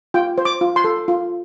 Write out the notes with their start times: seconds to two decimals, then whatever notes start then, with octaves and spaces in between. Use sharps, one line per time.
0.14 F4 G5
0.38 C5
0.45 D6
0.61 F4
0.76 C6
0.84 A4
1.08 F4